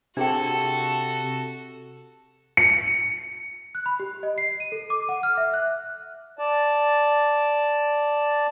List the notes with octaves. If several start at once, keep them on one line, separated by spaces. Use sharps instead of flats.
C3 D4 F#4 G#4 A4 G5
C#7
F#6
B5
G4
D#5
C7
D#7
A4
D6
F#5
F6
E5
F#6
D5 A5